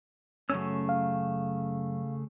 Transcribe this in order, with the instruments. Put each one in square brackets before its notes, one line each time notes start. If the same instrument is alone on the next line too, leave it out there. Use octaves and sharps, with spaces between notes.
[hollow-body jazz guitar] F#2 C#4 [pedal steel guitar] C#3 A3 E6
[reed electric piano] F5